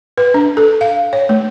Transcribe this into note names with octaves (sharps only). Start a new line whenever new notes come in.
B4
D4
A4
F5
C#5
A3